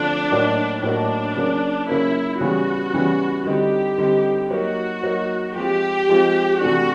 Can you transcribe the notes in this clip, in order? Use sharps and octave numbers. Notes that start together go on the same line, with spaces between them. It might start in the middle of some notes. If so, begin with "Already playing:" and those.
Already playing: D3 F3 A3 C4 D4 F4
A2 F#3 A#3 D#4 F#4
A2 F#3 A#3 D4 D#4 F#4
C#3 F#3 A#3
C#3 F#3 A#3 E4
C#3 E3 G3 B3 F#4
C#3 E3 G3 B3
D3 G3 C4 D#4 G4
D3 G3 C4 D#4
F#3 A#3 D#4 F#4
F#3 A#3 D#4
F3 G#3 C4 F4 G4
F3 G#3 C4 F4
C3 E3 A3 D4 F#4